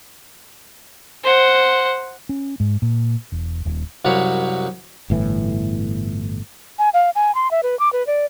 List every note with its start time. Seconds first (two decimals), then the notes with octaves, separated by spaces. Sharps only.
1.24 C5 F#5
2.29 C#4
2.60 G#2
2.82 A#2
3.32 E1
3.65 D#1
4.05 C2 F#2 F#3 C#5 F5 B5
5.10 G1 A2 E3
6.79 G#5
6.94 F5
7.15 G#5
7.35 C6
7.51 E5
7.63 B4
7.79 D6
7.93 B4
8.07 D5